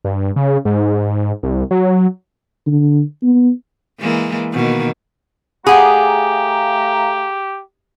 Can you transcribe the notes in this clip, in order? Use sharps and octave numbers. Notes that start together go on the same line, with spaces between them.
G2
C#3
G#2
C2
F#3
D3
B3
E3 G#3 A#3
B2 D#3 A#3
A3 G4 G#4 D5 F5 F#5 A#5 B5